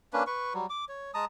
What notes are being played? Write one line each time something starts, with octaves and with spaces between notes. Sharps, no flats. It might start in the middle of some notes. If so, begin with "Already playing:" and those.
A#3 C#4 D4 B4
B4 C#6
F#3 G3
D6
C#5
G#3 A5 A#5 D#6